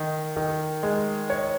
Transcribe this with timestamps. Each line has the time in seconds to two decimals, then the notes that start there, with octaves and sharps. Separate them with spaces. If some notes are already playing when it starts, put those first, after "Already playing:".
Already playing: D#3
0.36 D#3
0.83 G#3
1.30 C#5